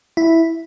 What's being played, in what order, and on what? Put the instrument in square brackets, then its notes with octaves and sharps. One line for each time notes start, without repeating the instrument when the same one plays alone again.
[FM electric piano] E4